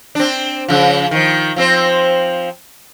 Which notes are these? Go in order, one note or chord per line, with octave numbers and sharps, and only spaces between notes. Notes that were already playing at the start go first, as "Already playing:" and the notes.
C4 D4
C#3 F3
D#3 F3
F3 C4 C5